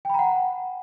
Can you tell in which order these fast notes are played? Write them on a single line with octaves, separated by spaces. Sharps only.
G5 B5 A#5 F#5